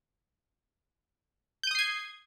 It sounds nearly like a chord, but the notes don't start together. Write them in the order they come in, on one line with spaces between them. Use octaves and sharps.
G6 D#7 D#6 C7 G#6